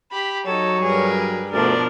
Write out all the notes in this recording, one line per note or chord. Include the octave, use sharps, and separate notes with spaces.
G4 B5
F#3 D#4 A4 C#5
G2 G3 G#4 A#4 B4
D2 B2 F3 D4 A#4 D5